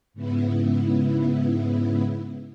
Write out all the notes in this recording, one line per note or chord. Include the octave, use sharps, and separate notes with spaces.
G#2 C#3 B3 E4